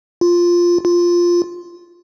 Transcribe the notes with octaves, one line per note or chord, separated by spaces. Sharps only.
F4
F4